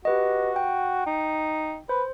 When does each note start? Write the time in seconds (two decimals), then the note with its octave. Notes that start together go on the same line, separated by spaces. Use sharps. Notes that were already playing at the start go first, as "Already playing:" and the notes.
0.05 F#4 G4 B4 D#5
0.56 G5
1.07 D#4
1.89 B4 C5